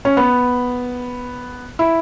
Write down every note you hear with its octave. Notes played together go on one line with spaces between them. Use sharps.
C#4
B3
E4